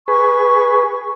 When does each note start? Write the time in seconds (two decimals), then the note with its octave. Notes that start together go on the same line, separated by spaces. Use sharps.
0.08 G#4 B4 C#6